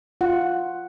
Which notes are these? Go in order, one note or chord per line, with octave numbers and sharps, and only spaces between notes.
F4 F#5